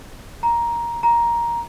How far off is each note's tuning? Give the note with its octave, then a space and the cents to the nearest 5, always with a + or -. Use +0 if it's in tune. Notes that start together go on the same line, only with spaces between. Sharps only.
A#5 +10
A#5 +10